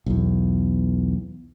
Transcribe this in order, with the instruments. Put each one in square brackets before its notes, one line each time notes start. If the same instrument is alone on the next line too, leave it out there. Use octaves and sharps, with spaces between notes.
[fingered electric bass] B1 E2